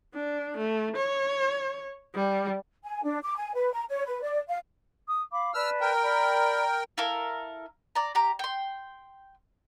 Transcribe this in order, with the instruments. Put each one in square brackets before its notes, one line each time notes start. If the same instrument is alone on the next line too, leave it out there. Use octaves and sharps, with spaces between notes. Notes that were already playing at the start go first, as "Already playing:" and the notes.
[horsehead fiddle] D4
A3
C#5
G3
[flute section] G#5
D4
D6
G#5
B4
A#5
C#5
B4
D5
F5
D#6
F5 B5 D6
[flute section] B4 D5 A5 [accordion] E6 F6
[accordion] A#4 G5
[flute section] D5 B5
[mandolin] E4 A4 A#4 F5
D5 A#5
G4 A#5
G5 C6